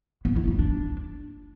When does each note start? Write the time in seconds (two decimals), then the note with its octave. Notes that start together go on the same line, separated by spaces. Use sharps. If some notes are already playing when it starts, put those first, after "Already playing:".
0.25 B3
0.36 E4
0.48 D#4
0.59 D4